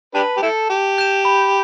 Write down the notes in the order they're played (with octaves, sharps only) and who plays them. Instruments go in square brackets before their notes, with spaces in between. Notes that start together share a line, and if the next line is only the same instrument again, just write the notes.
[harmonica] D4 G4 B4 [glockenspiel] A5
[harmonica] G4
[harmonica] E4 A4 [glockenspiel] G6 E7
[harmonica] G4 [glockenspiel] A5
[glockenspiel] G6 E7
B5